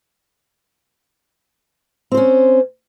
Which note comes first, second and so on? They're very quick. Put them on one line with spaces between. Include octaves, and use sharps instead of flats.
C4 C5 C#4